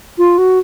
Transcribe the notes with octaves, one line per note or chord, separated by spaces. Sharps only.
F4
F#4